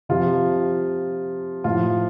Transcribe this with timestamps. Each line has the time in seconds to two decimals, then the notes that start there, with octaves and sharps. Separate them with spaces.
0.09 C3 F3 F4
1.64 A2 F3 F4